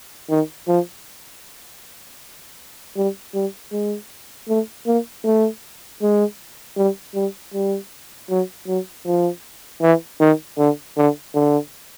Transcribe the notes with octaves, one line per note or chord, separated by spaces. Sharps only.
D#3
F3
G3
G3
G#3
A3
A#3
A3
G#3
G3
G3
G3
F#3
F#3
F3
E3
D#3
D3
D3
D3